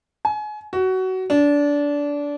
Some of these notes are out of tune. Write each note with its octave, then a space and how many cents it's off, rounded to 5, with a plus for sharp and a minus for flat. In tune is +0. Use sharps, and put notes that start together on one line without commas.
G#5 +30
F#4 +20
D4 -20